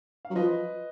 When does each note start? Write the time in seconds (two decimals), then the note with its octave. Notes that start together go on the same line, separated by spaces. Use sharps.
0.25 F5
0.30 F#3
0.35 F3 B4 D#5